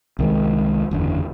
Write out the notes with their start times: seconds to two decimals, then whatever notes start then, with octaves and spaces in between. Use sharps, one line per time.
0.19 C2 D#3 G#3
0.91 F#1 E2 D3